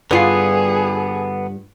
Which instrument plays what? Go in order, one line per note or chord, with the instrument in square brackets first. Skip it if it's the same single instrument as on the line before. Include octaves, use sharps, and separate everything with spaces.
[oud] G2 F4 [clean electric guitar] D3 B3 [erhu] G#4 [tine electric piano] B4 C7